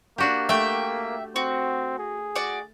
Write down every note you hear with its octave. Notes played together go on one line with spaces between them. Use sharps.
A#3 D4 F#4 G4
A3 E5 G5
C4 F#4
G#4
F#4 D5